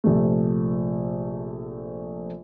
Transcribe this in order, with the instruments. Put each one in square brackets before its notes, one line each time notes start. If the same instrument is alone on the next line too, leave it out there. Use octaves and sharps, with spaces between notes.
[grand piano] A#1 C3 A3